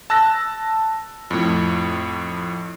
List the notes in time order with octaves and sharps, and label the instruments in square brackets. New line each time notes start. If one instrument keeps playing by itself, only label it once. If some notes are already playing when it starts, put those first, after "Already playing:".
[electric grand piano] A5 E6 F#6 A#6
F2 A2